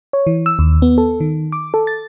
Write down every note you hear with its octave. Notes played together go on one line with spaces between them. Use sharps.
C#5
E3
E6
D#2
B3
A4
D#3
D6
A4
A6